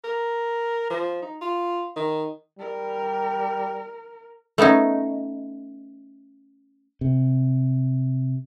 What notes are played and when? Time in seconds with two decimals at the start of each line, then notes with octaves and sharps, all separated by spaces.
0.04 A#4
0.90 F3
1.22 D#4
1.41 F4
1.96 D#3
2.59 G3 A#4
4.58 A3 B3 C#4 D#4
7.01 C3